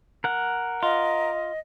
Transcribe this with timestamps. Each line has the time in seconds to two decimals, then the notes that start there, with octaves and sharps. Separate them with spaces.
0.24 A#4 F#5
0.83 F4 D#5